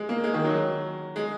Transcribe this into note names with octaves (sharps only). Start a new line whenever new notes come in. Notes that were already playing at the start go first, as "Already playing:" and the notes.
Already playing: G#3
A#3
G#3
D#3
F#3
G#3